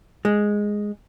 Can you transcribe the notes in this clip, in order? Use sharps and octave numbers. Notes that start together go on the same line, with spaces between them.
G#3